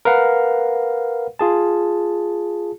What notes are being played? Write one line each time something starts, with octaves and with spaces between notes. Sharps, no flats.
A#4 B4 F5 F#5
F4 G#4 A5